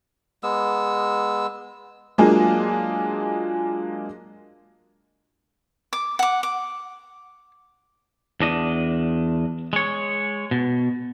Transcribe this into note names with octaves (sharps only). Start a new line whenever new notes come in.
G#3 B3 E6
F#3 G#3 A#3 D4 F4 G#4
D6
F#5 D6
D6
E2 D4 D#5
G#3 C#5
B2